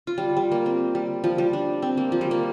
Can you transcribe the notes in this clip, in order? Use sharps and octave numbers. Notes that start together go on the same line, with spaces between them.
F4
G3
G3
A#3
C4
G3
F3
G3
D4
C4
A#3
F3
G3
A#3